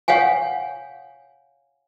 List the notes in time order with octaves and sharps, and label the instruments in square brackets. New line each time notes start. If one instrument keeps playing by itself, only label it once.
[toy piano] C#5 F5 F#5 G#5